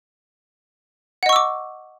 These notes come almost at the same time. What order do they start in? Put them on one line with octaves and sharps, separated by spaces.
F#5 D#5 C#6 E6 D6